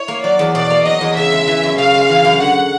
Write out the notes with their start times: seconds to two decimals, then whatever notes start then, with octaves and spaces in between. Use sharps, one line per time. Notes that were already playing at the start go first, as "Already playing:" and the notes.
Already playing: E4 C#5
0.08 A#3
0.24 F#3 D5
0.39 E2
0.55 B2 D5
0.70 A#3
0.85 F#3 D#5
1.01 E2
1.16 C#3 E5
1.32 G#3
1.47 E3
1.63 F#2
1.78 C#3 F5
1.94 G#3
2.09 E3
2.25 F#2
2.40 D3 F#5